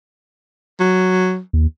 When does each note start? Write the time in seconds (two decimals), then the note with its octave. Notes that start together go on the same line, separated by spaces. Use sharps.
0.80 F#3
1.53 D#2